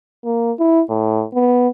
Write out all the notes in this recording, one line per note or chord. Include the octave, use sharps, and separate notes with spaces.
A#3
E4
A2
B3